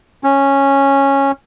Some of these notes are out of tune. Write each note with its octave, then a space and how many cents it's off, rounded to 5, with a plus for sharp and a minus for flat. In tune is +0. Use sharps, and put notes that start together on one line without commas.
C#4 -10